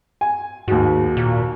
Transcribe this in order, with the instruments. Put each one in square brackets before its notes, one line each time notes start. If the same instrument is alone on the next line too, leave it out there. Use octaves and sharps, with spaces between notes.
[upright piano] G#5
[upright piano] D#2 F#4 [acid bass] G#2
[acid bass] A#2